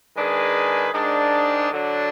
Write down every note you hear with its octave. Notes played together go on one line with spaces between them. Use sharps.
D#3 G#3 D4 G#4 B4
G#2 D#3 G#3 D4
D3 F#3 D4